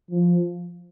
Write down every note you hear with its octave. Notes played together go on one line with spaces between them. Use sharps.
F3